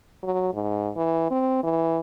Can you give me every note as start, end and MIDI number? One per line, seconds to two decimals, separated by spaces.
0.23 0.51 54
0.54 0.91 44
0.97 1.29 52
1.31 1.59 60
1.63 2.00 52